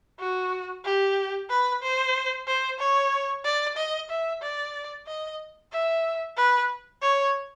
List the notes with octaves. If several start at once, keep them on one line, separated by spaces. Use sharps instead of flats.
F#4
G4
B4
C5
C5
C#5
D5
D#5
E5
D5
D#5
E5
B4
C#5